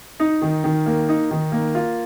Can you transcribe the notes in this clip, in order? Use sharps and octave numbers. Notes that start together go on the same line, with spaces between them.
D#4
D#3
D#3
A#3
D#4
D#3
A#3
F4